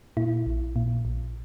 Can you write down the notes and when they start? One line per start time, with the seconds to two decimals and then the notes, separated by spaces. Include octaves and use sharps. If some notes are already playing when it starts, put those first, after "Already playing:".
0.17 A#2 E4
0.46 A#1
0.76 A#2
1.05 A#1